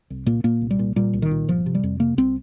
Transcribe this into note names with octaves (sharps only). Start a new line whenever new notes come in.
C2
A#2 A#3
A#2 A#3
C2
G3
A#2
A#2 G3
C2
D#3
A#2
G1 F3
C3
G3
F2
C3 A#3
C2 C4